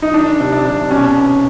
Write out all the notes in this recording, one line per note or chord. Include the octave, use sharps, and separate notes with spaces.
D#4
D#3 D4
C3
D4
C3
B2 C#4
B3